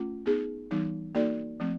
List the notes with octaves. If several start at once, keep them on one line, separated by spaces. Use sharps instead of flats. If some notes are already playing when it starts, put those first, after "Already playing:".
Already playing: A3 C#4 F4
B3 D#4 G#4
E3 G3 B3 D#4
A#3 D#4 F#4 A4 D5
F3 A3 C4